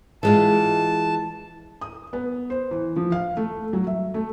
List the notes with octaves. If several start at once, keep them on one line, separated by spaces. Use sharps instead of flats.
E3 G#3 F4 A5
D#6
B3
C5
E3
F3
F5
A3
F#3
E5
A3